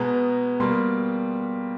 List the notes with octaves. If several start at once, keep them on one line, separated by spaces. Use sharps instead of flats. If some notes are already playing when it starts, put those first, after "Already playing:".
Already playing: B2 G#3 B3 A#5
B2 G3 A#3 C6